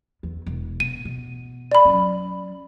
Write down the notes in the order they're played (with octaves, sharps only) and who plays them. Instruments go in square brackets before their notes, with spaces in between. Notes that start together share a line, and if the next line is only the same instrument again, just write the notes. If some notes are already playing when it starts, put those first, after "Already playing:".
[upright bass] E2
E1
[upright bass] B2 [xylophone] D#7
[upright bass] B2
[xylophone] D5 B5
[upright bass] F#3 C#4